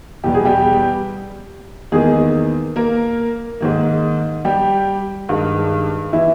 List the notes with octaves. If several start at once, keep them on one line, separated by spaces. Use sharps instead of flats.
E2 B2 G3 B3 G4
G#4
G3 G4
E2 D#3 G#3 A#3 G#4
A#3 A#4
G#2 D#3 A#3
G3 G4
G2 D#3 G#3
E3 E4